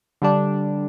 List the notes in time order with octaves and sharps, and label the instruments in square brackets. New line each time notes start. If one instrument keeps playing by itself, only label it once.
[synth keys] D3 G3 D4